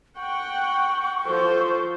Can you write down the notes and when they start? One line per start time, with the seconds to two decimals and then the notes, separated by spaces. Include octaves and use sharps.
0.17 F#5 G5 C#6
1.27 F3 A4 C5